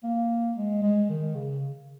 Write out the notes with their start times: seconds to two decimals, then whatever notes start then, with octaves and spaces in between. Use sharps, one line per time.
0.04 A#3
0.56 G#3
0.82 G#3
1.10 D#3
1.35 C#3